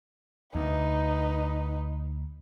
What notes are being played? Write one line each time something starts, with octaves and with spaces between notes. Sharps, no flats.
D2 D#4 B4